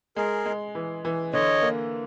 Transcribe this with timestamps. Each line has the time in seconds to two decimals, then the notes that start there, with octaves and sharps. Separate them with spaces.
0.16 G#3 G#4 A#4
0.46 G#3
0.75 E3
1.05 E3
1.33 D3 C#5 D#5
1.62 A#3